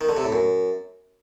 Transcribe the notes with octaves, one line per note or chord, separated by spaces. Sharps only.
D#3
D3
C3
A2
F#2